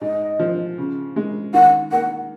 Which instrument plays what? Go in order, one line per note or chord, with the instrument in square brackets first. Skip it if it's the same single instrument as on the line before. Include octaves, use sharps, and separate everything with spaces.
[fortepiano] G#2 [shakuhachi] D#5
[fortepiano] F3
C#3
G#3
[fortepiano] D#3 [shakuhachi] F#5
[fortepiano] A#3 [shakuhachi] F#5